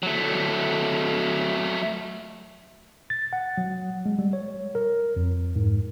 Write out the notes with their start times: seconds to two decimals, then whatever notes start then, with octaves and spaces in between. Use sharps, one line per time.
0.03 F#3 A3
3.10 A6
3.33 F#5
3.58 F#3
4.06 G#3
4.19 G3
4.33 C#5
4.75 A#4
5.16 F2
5.56 G#2